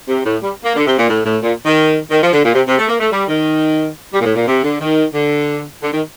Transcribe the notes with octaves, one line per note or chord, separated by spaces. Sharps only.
C3
A2
G3
A#3
D3
C3
A#2
A2
A2
A#2
D#3
D#3
F3
D3
A#2
C3
C3
A3
A#3
A3
G3
D#3
G3
A#2
A2
A#2
C3
D3
D#3
D3
D3
D#3